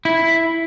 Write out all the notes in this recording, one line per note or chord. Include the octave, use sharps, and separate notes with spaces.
E4